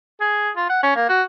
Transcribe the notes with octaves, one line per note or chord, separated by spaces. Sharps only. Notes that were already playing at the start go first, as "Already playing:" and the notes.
G#4
F4
F#5
C#4
A#3
F#4